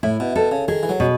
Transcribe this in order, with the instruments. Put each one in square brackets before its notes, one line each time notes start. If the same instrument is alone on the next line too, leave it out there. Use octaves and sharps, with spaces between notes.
[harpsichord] A2 [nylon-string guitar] E4
[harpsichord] B2
[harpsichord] B2 [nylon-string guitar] A4
[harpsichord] C#3
[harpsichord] D#3 [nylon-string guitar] G#4
[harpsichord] E3
F#3
[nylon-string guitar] B2